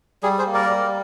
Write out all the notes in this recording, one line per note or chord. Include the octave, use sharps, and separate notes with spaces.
G3 G#4
G#4 C5
A#3
A#4 D5
G3